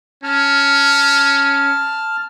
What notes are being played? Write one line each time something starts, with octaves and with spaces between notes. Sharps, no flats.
C#4 A5 F6